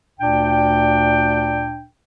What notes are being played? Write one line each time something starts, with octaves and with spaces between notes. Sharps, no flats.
D2 A#2 D4 G5